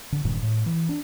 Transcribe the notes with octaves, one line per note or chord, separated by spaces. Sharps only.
D3
E1 G2 A#2 D#3
A2
E3
D4